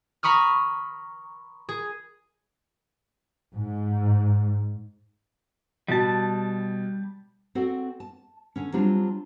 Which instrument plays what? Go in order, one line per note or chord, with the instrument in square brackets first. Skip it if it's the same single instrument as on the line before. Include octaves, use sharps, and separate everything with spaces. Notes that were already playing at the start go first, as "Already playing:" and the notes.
[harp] A#5 B5 C#6 D#6 F6
G#4
[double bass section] G#2
[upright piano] B2 [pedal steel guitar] G3 A5
[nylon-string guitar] C4 F#4 A4 D5 F#5
A5
D3 C#4
F#3 G3 C4 D4 F4